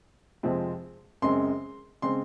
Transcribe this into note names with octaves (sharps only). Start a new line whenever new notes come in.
F2 C3 F3 G#3 C4
F#2 C#3 G#3 C4 C6
C#3 G#3 C4 C6